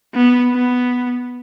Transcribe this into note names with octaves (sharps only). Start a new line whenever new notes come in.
B3
B3